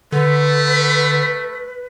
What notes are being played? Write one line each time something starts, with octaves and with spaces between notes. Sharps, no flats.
D3 A3 B4